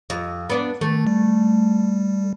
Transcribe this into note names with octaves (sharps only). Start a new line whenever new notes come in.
F2 D#5
B3 D4
D#3 A3
G3